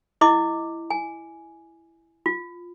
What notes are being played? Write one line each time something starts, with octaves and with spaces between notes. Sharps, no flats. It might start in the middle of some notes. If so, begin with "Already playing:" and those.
E4 D#5 D6
G#5
F4